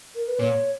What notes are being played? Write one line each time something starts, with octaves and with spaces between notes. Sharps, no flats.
A#4
B4
A#2 C#5